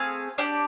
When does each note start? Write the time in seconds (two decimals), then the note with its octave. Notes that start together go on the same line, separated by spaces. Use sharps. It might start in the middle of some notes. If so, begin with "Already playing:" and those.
Already playing: A3 C4 G#4 F5
0.38 D4 G4 D5